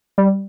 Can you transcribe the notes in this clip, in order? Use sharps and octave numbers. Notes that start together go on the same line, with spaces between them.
G3